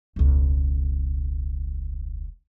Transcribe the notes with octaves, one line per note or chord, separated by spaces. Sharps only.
E1 C#2